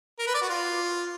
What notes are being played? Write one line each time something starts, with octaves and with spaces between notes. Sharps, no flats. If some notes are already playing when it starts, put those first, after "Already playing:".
A#4
B4
D5
F#4
F4